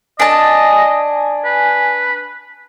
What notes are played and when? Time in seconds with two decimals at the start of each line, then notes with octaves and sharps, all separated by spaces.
0.20 D4 D#5 G#5 A5
1.45 B4